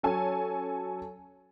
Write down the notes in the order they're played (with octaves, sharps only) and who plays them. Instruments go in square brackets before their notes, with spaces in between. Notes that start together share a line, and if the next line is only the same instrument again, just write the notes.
[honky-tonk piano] F#3 C#4 A4 C#5 G#5 A5